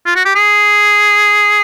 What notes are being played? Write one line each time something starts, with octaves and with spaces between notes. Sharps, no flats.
F4
F#4
G4
G#4